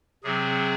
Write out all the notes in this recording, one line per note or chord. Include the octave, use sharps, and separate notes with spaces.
C3 F#3 C4 G#4